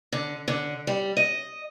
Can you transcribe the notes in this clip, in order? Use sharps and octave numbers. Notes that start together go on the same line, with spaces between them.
D3
D3
G3
D#5